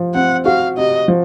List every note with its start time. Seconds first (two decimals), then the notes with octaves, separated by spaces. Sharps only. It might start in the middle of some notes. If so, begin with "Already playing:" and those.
Already playing: F3
0.14 C4 F#5
0.46 F#4 F5
0.77 C3 D#5
1.08 F3